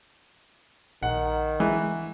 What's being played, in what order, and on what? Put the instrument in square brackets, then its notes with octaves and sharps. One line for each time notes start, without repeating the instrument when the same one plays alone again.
[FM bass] A#1 [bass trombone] D#3 [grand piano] F#5
[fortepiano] E3 [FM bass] G#3